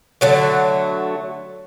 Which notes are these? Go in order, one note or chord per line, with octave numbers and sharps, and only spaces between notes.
D3 F#3 A3